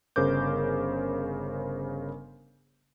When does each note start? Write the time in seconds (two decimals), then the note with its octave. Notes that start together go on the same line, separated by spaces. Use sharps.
0.16 G1 C#3 A#4 C5 D6 G6